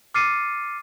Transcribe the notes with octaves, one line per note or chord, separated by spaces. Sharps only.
D6 F6 A6 C7 C#7 D#7